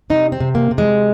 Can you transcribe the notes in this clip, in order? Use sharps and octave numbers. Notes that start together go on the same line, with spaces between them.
C3 D#4
C4
C3
A#3
C3
G#3